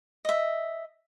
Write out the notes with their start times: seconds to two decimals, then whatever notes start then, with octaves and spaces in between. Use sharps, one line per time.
0.25 D#5 E5